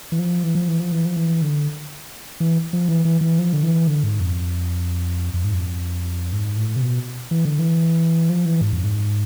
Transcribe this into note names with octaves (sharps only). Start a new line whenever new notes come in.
E3
F3
E3
F3
E3
F3
E3
F3
E3
D3
E3
F3
E3
E3
E3
F3
D3
E3
D3
G#2
F2
F2
G#2
F2
G#2
A2
C3
B2
E3
D3
E3
F3
E3
G#2
F2
G#2